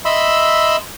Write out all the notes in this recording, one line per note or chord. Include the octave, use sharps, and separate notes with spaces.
D#5 E5 B5 C6 E6